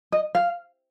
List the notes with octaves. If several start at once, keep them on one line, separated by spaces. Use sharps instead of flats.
D#5
F5